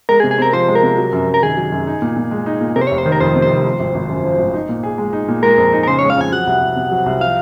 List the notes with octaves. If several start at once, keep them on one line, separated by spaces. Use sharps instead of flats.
G#3 A#4
G#4
C3
G#4
C4 A#4
F3 C5
G#3
A#4
C3
F#3
F#2
F#2
A#4
D#3 G#4
F#3
F#2
D#4
A#2
A#2
G#3
D#4
A#2
C3 A#4
C5
F1 C#5
C5
D#3
A#4
F2 C5
C3
C5
F1
F3
G#1
G#1
F#2
F3
G#1
D#4
A#2
G#4
G#3
D#4
A#2
G#3 A#4
F2
D#4
A#4
C#3 C5
G#3 C#5
F5
F2 G#5
F#3 F#5
C2
C2
C3
F#3
C2
F3 F5